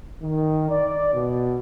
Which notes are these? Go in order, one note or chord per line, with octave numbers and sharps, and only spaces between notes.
D#3
D5
B2